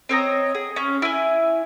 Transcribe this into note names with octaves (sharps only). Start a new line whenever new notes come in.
C4 C#5 D#5 A#5
G#4
C#4
E4 G#5